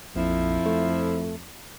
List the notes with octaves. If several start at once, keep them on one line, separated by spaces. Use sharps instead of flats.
A#1 F2 F3 E4
A3